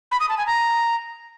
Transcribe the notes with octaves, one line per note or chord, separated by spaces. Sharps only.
B5
D#6
A5
G#5
A#5